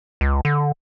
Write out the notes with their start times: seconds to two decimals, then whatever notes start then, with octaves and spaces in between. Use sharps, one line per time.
0.21 C#2
0.45 D3